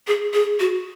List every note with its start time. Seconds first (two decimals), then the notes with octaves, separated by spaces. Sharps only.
0.07 G#4
0.34 G#4
0.60 F#4